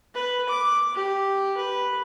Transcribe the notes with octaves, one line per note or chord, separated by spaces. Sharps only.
B4
D6
G4
B4